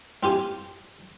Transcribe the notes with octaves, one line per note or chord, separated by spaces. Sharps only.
C4 F4 G4 G#5